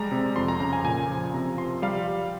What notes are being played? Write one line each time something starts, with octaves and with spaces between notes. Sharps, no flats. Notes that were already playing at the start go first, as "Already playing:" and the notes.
Already playing: G3 G#3 A#5
C3
F2 C6
A#5
C#3 A#5
G#5
A#2 G#5
F3
C3 A#5
F3 C6
G3 F5
G3